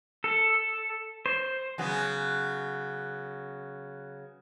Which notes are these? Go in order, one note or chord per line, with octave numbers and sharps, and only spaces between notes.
A4
C5
C#3 F#3 B3